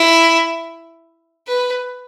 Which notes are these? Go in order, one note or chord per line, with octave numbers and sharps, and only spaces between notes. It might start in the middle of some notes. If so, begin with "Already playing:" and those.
Already playing: E4
B4